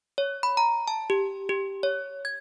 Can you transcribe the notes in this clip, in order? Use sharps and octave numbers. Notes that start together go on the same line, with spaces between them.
C#5
B5
A#5
A5
G4
G4
C#5
G#6